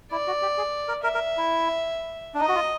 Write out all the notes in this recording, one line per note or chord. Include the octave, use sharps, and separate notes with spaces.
E4 D5
F#4
G4
G#4
A#4
A#4 E5
A#4
E4
D4
D#4 D#5
F#4
F4